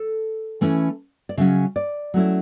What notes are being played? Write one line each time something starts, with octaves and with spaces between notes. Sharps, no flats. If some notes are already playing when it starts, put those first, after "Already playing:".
Already playing: A4
E3 A3 C#4 E4
D5
C#3 F#3 C#4 E5
D5
F#3 A3 C#4 E4